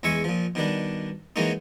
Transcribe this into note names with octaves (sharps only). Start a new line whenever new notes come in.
E2 G#3 E5 G#5 C#6
A#2 F3
B2 D#3 G3 D4
E3 F#3 G#3 A#3 C#4 D#4